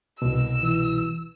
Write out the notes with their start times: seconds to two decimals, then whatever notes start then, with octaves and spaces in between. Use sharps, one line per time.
0.22 C2 B2 E6
0.62 E3